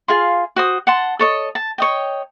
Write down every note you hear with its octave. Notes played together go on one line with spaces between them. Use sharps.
F4 G#4 F5 C6
F#4 C5 D#6
F#5 A5 C6
A4 C#5 D#5
A5
C#5 D#5 G5